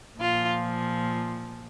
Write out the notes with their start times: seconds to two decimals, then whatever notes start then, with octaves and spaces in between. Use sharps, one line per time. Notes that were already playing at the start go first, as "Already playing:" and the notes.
0.19 A#2 F3 F4